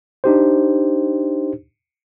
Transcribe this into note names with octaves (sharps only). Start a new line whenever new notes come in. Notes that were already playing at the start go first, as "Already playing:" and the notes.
D4 D#4 G4 C5